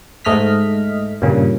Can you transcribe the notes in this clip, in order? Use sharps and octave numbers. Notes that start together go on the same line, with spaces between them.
G#2 A3 D#5 F6 B6
G2 A#2 C#3